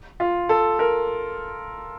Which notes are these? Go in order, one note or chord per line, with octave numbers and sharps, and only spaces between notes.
F4
A4
A#4